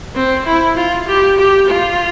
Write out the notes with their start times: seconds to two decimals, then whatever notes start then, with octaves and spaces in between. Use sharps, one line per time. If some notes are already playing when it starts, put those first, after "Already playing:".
0.15 C4
0.46 E4
0.76 F4
1.08 G4
1.38 G4
1.68 F4